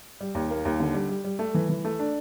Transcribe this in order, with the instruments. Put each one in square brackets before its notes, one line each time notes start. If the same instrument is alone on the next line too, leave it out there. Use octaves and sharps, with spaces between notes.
[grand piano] G3
D#2
A#3
D#2
D3
G3
G3
G3
A3
E3
E3
A3
D4